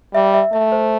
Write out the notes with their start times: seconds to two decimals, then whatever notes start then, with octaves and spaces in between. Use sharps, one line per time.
0.14 G3 E5
0.34 E5
0.53 A3 E5
0.72 C5